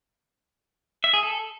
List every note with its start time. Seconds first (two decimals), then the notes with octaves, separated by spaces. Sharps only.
1.04 E5
1.13 G#4
1.23 A4